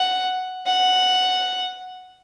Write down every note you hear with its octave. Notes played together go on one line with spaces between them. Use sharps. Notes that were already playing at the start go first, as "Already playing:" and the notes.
Already playing: F#5
F#5